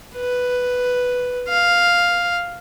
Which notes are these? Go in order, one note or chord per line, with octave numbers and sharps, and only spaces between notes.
B4
F5